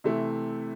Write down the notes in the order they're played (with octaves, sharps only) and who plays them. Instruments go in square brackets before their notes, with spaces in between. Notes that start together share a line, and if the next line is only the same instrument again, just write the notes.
[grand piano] C3 E3 A3 E4